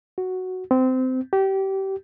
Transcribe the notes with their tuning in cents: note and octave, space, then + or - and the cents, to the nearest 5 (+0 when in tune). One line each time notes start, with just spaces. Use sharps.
F#4 +0
C4 -20
G4 -25